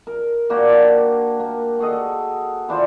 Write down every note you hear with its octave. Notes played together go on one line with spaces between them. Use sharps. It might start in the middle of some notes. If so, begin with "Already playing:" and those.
A#4
A#3 D4 F#4 G4
A#3
F#4 G#4 A4 D#5
E3 D4 F4 C5